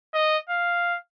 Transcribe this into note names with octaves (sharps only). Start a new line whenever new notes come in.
D#5
F5